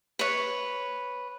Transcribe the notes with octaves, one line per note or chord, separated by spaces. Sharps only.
B4 C#5